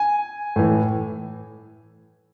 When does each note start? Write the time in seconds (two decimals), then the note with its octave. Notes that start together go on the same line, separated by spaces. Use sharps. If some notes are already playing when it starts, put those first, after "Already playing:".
Already playing: G#5
0.56 A2 E3